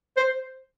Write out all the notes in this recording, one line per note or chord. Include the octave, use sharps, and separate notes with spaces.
C5